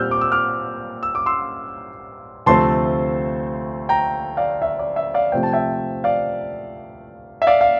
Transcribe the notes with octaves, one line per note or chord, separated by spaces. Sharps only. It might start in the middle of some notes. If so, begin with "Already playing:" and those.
Already playing: A#2 G3 C4 E6 F6 G6
D6
E6
D6 F6
E6
D6
C6 E6
D2 C3 F3 A3 C4 A5 C6
G5 A#5
D5 F5
E5
D5
E5
D5 F5
C3 F3 A3 C4 G5
A5
E5 G5
D5 F5
E5
D5 F5
F5